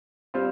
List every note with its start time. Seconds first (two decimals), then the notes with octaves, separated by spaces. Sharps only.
0.34 G3 C4 F4